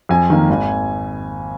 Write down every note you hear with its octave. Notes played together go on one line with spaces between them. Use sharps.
F2 G#5
D#3 A#3
G#1